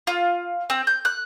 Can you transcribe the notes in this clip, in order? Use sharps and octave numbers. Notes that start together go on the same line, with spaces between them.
F4
C4
G6
F#6